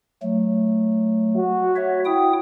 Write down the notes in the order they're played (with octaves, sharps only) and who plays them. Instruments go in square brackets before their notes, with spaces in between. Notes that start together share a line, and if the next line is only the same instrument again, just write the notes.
[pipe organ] F#3 A3
[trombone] F#4
[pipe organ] C#5 E5
E4 G5 D#6